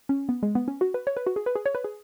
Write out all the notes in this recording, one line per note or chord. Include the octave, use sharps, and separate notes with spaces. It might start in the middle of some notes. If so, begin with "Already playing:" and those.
C#4
B3
G#3
B3
C#4
F#4
B4
C#5
B4
F#4
G#4
B4
G#4
C#5
B4
G#4